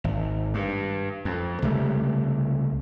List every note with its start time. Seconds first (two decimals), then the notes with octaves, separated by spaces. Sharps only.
0.04 G#1
0.54 G2
1.25 F2
1.62 C#2 C3 G3 A3